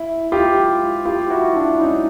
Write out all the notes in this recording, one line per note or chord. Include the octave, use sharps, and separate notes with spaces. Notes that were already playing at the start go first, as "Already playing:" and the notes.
Already playing: E4
F4 G4
F4 G4
E4 F#4
D4 E4
C#4 D#4